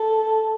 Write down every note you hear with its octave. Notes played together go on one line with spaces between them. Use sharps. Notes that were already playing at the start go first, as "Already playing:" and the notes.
Already playing: A4